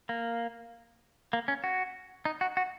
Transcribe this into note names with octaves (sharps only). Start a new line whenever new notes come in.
A#3
A#3
C#4
F#4
D#4
F#4
F#4